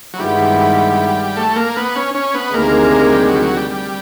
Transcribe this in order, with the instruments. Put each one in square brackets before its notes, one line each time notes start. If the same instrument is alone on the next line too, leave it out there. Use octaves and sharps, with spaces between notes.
[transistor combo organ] F#3
[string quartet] G2 D#3 G#3 B3 E4 [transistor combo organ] G3
[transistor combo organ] A3
A#3
B3
C#4
C#4
B3
[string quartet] D2 C3 D#3 G#3 [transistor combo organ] A#3
[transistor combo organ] G3
F#3
G3
F#3
G3
G3